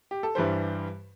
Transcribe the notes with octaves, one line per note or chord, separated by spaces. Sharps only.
G4
A4
G2 E3 G3 C5